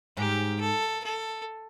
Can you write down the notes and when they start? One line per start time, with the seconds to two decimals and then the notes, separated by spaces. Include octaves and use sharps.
0.17 G#2 G4
0.61 A4
1.04 A4